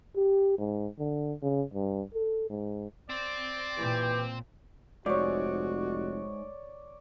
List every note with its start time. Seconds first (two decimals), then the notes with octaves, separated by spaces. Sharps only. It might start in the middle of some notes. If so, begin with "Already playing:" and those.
0.16 G4
0.59 G#2
0.99 D3
1.42 C#3
1.74 G2
2.14 A4
2.50 G#2
3.09 C4 D5
3.78 A#2 E3 G4
5.06 F1 G#2 F#4 C#5 D5